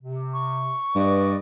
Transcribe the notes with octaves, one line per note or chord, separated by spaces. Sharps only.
C3
C#6
G2 B4 D5 D#5